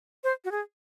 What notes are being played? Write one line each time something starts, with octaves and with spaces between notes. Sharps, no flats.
C5
F#4
G#4